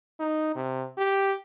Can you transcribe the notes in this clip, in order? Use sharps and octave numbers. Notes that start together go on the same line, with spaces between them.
D#4
C3
G4